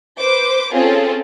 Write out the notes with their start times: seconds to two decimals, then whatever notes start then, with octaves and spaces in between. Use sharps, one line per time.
0.20 B4 C5 D6
0.72 C4 C#4 F4 G#4 A4